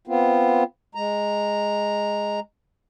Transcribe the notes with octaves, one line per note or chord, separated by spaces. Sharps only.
B3 C4 F4
G#3 A#5